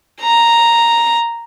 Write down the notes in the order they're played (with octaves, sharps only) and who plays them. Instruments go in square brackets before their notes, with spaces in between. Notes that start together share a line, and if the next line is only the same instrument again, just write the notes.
[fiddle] A#5